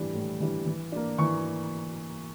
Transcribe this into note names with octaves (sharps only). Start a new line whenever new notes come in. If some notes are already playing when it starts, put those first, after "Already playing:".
Already playing: A2 E3 G3 D4
A2
E3 G3 D4
E3
A#3 D4
E3 C#6